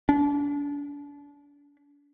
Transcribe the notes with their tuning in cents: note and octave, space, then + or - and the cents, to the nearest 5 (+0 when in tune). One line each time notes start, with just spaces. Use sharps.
D4 -35